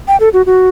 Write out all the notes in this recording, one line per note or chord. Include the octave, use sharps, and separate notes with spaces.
G5
A4
F#4
F#4